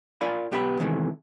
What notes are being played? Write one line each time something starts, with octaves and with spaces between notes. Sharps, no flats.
F4 A#4 D5 F5 G#5 B5
B1 B3 G4 E5 G5 B5
E2 C3 D#3 E3 G#3 A3